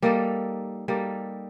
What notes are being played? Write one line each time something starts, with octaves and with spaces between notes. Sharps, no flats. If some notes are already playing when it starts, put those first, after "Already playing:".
G3 A#3 D#4 A4
G3 A#3 D#4 A4